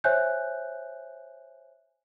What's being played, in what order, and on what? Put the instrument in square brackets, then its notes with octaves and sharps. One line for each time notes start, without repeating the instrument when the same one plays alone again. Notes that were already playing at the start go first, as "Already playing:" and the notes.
[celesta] C5 C#5 E5 G#5 F#6 G6